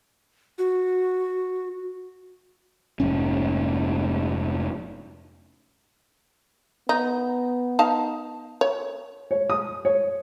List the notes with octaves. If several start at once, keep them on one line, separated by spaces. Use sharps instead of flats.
F#4
F1 G#2 C#4
B3 D#4
D#4 F5 A5
C#5
C#5
D#6
C#5